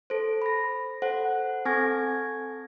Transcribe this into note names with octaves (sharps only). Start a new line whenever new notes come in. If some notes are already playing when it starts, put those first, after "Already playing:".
A4 C5
B5 A#6
A4 C5 F#5
C4 A4 G#5 C#6 G#6 A#6